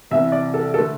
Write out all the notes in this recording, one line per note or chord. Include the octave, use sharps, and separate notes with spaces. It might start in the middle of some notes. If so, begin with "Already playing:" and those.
C2 C3 E3 E5
D5
A4
D3 A3 A4